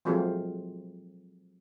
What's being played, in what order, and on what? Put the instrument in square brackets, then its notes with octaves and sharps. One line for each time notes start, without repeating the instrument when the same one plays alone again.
[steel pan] F3 F#3 G#3 A3 C4 F4